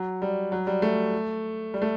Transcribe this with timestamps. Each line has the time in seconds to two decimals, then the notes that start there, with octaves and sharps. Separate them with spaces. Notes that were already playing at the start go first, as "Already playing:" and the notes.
Already playing: F#3
0.22 G3
0.52 F#3
0.67 G3
0.82 A3
1.74 G3
1.82 A3